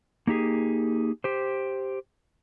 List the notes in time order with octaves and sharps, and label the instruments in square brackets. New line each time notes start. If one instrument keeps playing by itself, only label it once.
[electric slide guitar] A#3 D#4 G4 G#4
G4 C5